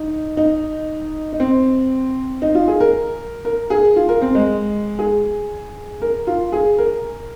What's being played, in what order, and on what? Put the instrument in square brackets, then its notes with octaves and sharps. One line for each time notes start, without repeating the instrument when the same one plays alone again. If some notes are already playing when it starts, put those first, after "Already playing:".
Already playing: [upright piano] D#4
D#4
D#4
C4
D#4
F4
G#4
A#4
A#4
G#4
F4
A#4
C4
G#3
G#4
A#4
F4
G#4
A#4